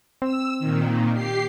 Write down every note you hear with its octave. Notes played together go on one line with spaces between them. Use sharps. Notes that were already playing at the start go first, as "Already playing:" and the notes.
C4 E6
A#2 D#3
G4 C7